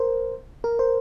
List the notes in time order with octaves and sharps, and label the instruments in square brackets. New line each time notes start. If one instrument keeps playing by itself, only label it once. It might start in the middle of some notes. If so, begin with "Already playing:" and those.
Already playing: [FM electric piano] A#4 C5
A#4
C5